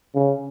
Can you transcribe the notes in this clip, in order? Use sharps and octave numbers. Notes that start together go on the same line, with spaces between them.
C#3